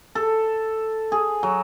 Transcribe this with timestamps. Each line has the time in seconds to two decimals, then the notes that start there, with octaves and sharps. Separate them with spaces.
0.15 A4
1.12 G#4
1.43 F#3